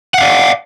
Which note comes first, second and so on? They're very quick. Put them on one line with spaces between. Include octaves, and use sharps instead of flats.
F#5 F5 D5